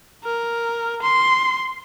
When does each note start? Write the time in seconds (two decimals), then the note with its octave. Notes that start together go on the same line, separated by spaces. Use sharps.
0.25 A#4
1.02 C6